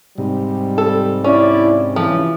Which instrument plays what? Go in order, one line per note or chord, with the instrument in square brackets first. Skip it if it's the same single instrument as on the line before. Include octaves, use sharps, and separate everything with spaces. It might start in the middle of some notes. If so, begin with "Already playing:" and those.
[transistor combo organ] G#2 C3 [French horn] G3
[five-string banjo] A4
[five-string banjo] C#4 [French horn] E4 [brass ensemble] D5
[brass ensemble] C#3 G4 [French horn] E3 [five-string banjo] F3